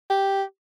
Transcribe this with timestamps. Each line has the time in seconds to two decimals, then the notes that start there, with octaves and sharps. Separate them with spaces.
0.10 G4